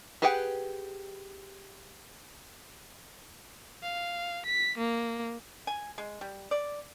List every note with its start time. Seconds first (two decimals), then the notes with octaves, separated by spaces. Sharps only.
0.22 G4 G#4 B4 F#5 G5
3.83 F5
4.46 B6
4.78 A#3
5.67 G#5
5.98 G#3
6.21 G3
6.51 D5